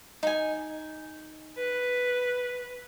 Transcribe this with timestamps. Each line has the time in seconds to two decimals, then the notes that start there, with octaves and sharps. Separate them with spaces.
0.23 D#4 G#5
1.58 B4